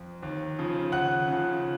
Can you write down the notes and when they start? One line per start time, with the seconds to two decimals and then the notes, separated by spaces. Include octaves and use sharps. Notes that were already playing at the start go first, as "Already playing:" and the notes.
Already playing: F2
0.23 D#2
0.59 C#3 F3
0.92 D#2 F#5 F#6
1.28 C#3 F3